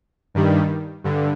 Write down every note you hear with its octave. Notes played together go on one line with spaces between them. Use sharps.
G2 D#3 G3
G2 D3